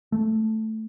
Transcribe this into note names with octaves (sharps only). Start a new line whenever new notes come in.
A3